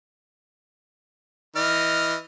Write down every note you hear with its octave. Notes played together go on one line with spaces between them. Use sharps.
E3 D#5 F6